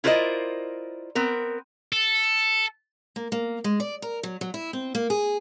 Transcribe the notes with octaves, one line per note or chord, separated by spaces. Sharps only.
E4 F4 A#4 C5 D5 D#5
B3 C4 A#4
A4
A#3
A#3
G#3
D5
A#4
F#3
F#3
E4
C4
A#3
G#4